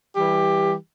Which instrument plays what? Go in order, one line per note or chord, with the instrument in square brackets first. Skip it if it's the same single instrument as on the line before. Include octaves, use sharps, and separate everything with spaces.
[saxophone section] E3 G3 G4